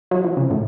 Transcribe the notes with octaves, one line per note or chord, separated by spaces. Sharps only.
F#3
F3
C#3
A2